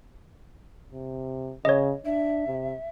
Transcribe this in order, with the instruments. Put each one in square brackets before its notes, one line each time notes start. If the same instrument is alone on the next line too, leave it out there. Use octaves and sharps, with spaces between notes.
[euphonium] C3
[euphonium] C#3 [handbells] C#5 D#5
[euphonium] D4 [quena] E5
[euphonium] C3